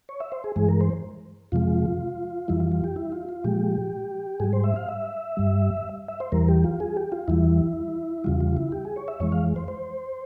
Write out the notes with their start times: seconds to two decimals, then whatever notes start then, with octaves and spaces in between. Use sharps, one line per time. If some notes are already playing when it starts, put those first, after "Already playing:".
0.09 C#5
0.20 E5
0.32 C5
0.44 G#4
0.56 G2 E3 G#3 G#4
0.68 A#4
0.81 C5
1.52 F2 C3 F3 G#3 F4
2.48 F2 E3 G3 E4
2.60 F4
2.72 F4
2.84 G4
2.96 E4
3.12 F4
3.29 F4
3.44 A#2 F3 G#3 G4
4.40 G#2 G3 G#4
4.53 C5
4.64 E5
4.76 F5
4.89 E5
5.37 G2 G3
6.08 E5
6.20 C5
6.32 E2 E3 G3 A#4
6.48 G4
6.64 F4
6.80 G#4
6.97 G4
7.12 F4
7.28 E2 E3 G3 E4
8.24 E2 C#3 G3 F4
8.40 F4
8.57 E4
8.72 G4
8.85 G#4
8.96 C#5
9.08 E5
9.20 F2 E3 G#3 C#5
9.32 F5
9.56 C5
9.68 C5